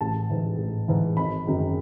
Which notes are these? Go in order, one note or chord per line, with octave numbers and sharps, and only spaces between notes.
A1 A5
G#2 E3
A1
G#2 E3
G#1 B5
F#2 D#3 G#3